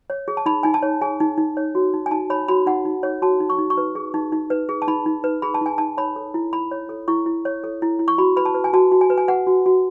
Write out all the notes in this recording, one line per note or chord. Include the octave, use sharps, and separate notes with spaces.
C#5
G#4
A5
D#4 B5
D#4 G#5
A5
C#5
G#4 G#5
D#4
D#4
C#5
F#4
D#4
G#5
D#4 A5
C#5 B5
F#4 B5
D#4 F#5
D#4
C#5
F#4 A5
D#4
C#6
D#4
C#6
B4
G#4
D#4
D#4
B4
G#4
A5
D#4 B5
D#4
B4
G#4 B5
A5
D#4 G#5
D#4 A5
C#5 B5
A4
E4
E4 B5
C#5
A4
E4 C#6
E4
C#5
A4
E4
E4
C#6
F#4 B5
B4 B5
A5
B4
G#5
F#4 A5
F#4
G#5
B4
G#5
B4 F#5
F#4
F#4